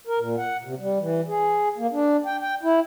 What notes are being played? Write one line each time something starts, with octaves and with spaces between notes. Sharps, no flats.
A#4
A#2
F#5
C3
G3
E3
G#4
A#3
D4
G5
G5
E4